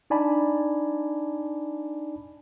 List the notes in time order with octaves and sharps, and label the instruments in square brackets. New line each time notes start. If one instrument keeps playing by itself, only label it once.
[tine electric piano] D4 D#4 D5 G#5 A5 B5